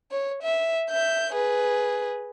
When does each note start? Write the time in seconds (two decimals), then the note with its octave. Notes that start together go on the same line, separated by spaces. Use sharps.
0.11 C#5
0.42 E5
0.90 E5 G6
1.34 G#4 B4